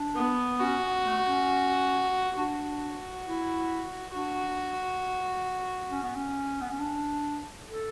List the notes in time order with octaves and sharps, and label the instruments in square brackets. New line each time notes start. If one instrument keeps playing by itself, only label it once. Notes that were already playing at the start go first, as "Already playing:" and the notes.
Already playing: [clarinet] D4
[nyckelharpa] B3
[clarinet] C#4 [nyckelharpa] F#4
[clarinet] B3
A3
C#4
[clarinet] D4 [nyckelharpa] F#4
[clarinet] E4
[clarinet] D4 [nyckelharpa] F#4
[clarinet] C#4
B3
C#4
B3
C#4
D4
A4